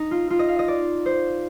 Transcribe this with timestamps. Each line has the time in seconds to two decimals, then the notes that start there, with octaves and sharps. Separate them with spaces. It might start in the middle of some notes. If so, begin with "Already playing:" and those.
Already playing: D#4
0.11 F4
0.30 F4
0.39 D#5
0.48 F5
0.59 D#5
0.68 D5
1.06 C5